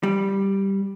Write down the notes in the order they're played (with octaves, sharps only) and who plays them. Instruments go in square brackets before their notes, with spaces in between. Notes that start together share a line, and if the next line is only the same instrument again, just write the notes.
[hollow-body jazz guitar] G3